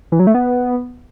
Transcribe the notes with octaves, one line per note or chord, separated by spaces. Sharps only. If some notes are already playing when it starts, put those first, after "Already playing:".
E3
F#3
A3
B3